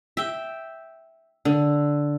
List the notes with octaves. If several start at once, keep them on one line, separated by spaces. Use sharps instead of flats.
E5 G5
D3